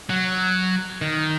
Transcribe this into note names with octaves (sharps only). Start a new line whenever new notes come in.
F#3
D#3